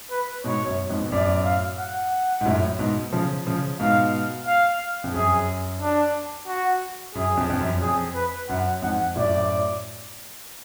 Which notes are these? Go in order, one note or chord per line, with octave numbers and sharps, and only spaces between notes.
B4
G#2 B2 C#5
F#2
F2 G#2
B2
F#2 A2 D5
F5
F#5
G#2
F#2 A2
G#2 B2
C#3 F3
C#3 F3
G#2 B2 F5
F5
F2
F#2 G#4
D4
F#4
F#2 G#4
F2
F2
F#2
F2 G#4
B4
F#2 F#5
F2 G#2 F#5
F#2 A2 D5